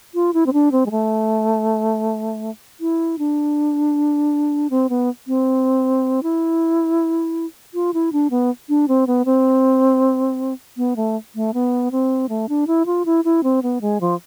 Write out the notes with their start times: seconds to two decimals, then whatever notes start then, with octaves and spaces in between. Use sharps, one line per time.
0.15 F4
0.34 E4
0.46 C4
0.53 D4
0.72 C4
0.86 G#3
0.91 A3
2.80 E4
3.19 D4
4.70 C4
4.90 B3
5.28 C4
6.23 E4
7.74 F4
7.94 E4
8.13 D4
8.31 B3
8.69 D4
8.88 C4
9.07 B3
9.25 C4
10.77 B3
10.96 A3
11.35 A3
11.54 B3
11.92 C4
12.29 A3
12.49 D4
12.67 E4
12.86 F4
13.06 E4
13.25 E4
13.43 C4
13.63 B3
13.81 G#3
14.01 F3